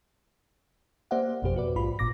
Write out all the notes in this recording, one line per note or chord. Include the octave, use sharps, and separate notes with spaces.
A#3 G4 C5 D5 E5 F#5
G#1 F2 B2 F3 G4 C5
F#4 B4 D5
A#1 G#2 F4 B5
G1 A#2 D6 A#6